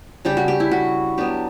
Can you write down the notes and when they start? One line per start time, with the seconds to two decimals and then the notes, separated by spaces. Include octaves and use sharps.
0.25 C#3 G3 D4 G4
0.37 F#4
0.48 G4
0.60 E4
0.71 F#4
1.18 F#3 B3 D4 G4